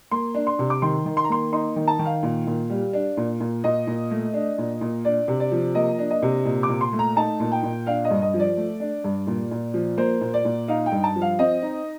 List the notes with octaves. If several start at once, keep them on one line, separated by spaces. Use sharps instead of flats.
A#3 C6
D4
C6
C3
D6
D#3 C6
D#3
C6
A#5
A#3 C6
D#4 C6
D#3
A5
D#3
F5
A#2
A#2
G3
D4
A#2
A#2
A#2 D#5
A#2
A3
D4
A#2
A#2
D4 D5
C3
D5
F3
A#3 D#5
D4
D#5
C3
A#2
D6
A#2
C6
A3
A#5
D#4 A5
A#2
G5
A#2
D4 F5
D#5
G2
D#5
F3
D5
A3
D4
G2
A#2
A#2
F3
A#3 C5
A#2
D5
A#2
D#4 F5
G5
G2
A5
F3
F5
C4 D#5
D#4